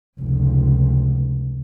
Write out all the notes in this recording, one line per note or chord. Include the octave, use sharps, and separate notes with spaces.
F1 C#2